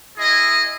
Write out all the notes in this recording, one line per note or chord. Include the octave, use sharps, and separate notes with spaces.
E4 G#4 D#5